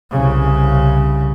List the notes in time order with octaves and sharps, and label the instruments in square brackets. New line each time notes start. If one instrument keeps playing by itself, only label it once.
[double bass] C2 C#3